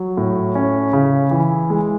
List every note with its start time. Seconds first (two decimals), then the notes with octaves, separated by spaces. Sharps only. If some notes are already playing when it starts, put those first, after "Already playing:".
Already playing: F#3
0.17 A2
0.55 C#4
0.93 C#3
1.31 E3
1.70 G#3